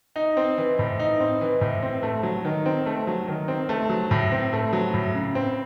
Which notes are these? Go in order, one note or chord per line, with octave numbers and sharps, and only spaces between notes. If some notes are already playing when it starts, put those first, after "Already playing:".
D#4
C4
E3
A2
D#4
C4
E3
A2
C4
A3
F#3
D#3
C4
A3
F#3
D#3
C4
A3
F#3
A2
C4
A3
F#3
A2
C#3
C4